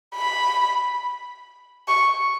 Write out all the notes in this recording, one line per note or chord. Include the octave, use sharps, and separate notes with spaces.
B5
C#6